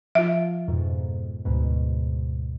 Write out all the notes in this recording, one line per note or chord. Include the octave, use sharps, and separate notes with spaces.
F3 F4 E5
F2 G#2 B2
D2 G#2 B2